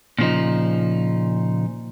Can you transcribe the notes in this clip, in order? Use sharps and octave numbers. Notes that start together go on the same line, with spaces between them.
A#2 C#3 F3 D#4